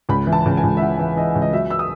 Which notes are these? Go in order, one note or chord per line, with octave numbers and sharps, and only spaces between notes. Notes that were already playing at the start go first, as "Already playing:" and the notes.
C#2 B5
E3
A5
C#2
G#5
C#2
E5
E3 F#5
E3
E3 D#5
C#2
D#5
F#3 E5
E6
D#6